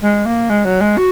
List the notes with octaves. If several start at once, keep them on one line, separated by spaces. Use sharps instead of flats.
G#3
A#3
G#3
F#3
G#3
F#4